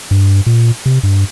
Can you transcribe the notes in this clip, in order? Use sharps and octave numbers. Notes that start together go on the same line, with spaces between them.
G2
A#2
C3
G2